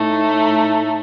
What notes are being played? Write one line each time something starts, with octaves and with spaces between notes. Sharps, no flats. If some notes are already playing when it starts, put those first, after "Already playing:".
Already playing: A2 A3 D#4